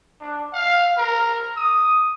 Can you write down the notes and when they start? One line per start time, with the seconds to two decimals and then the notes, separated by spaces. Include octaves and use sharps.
0.21 D4
0.53 F5
0.97 A#4
1.57 D#6